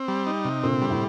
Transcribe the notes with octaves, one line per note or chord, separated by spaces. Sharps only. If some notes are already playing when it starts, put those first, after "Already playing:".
Already playing: C4
G3
D#4
C3
A#2 D3 C4
G3
A2 C3